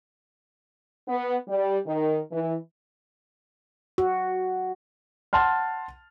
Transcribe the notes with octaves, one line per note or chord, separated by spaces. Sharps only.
B3
G3
D#3
E3
F#4
F#5 A5 C6 F6